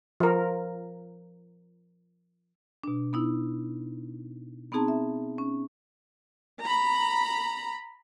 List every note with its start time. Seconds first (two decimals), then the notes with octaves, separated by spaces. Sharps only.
0.20 F3 A#4
2.83 B2 D4
3.13 B3 D#4 E4
4.72 B3 C4 D#4 G#4 A5 A#5
4.88 E5
5.38 C#4
6.62 A#5 B5